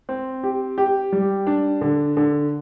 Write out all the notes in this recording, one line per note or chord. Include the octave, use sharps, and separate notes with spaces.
C4
G4
G4
G3
D4
D3
D3